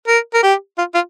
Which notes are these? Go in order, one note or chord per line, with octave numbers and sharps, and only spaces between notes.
A#4
A#4
G4
F4
F4